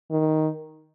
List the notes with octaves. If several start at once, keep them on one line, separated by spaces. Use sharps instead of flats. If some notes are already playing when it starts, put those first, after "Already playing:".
D#3